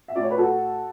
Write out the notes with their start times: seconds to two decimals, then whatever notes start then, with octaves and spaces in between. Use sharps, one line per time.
0.08 E5
0.15 A2 D5
0.23 C#5
0.30 B4
0.38 F#4 A4